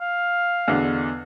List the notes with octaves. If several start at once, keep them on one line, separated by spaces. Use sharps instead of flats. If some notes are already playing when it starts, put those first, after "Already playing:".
F5
E2 B2 D3